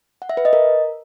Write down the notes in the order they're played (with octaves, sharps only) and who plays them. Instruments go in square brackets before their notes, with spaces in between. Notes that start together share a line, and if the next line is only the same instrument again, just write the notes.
[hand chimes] F#5
E5
B4
D#5
A#4